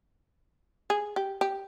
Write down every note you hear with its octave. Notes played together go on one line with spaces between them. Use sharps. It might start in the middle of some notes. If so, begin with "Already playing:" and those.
G#4
G4
G4